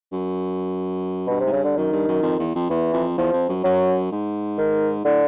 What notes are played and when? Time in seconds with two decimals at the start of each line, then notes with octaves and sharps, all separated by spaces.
0.12 F#2
1.27 G2 B2
1.40 C3
1.46 G#2
1.52 G2 C#3
1.64 D3
1.77 F#2 D#3
1.92 G2
2.08 F#2
2.23 F2
2.39 E2
2.55 F2
2.70 E2 E3
2.93 F2
3.18 E2 F3
3.33 F2
3.49 F#2
3.64 F#2 F#3
4.12 G#2
4.58 D#3
5.05 A2 D3